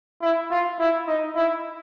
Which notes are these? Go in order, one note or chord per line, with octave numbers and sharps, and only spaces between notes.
E4
F4
E4
D#4
E4